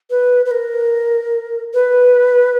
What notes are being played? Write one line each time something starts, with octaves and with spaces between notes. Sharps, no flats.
B4
B4
A#4
B4